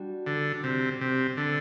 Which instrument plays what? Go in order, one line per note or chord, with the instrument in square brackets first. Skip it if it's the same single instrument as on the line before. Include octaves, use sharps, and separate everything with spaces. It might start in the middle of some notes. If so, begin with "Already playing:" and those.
Already playing: [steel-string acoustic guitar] G3 D4 F#4
[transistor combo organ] D3
C3
C3
D3